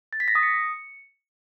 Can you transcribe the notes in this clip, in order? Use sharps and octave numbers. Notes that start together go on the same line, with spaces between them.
A6
B6
A#6
D#6
C#7